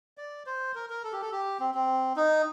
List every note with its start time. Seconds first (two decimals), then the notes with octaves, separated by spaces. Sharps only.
0.18 D5
0.46 C5
0.75 A#4
0.90 A#4
1.04 A4
1.12 G4
1.21 A4
1.32 G4
1.60 C4
1.75 C4
2.16 D#4